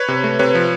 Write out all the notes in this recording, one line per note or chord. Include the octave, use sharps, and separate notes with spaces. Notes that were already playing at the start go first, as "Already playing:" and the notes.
Already playing: B4 C#5
C3
A3
C3 B4 C#5
F3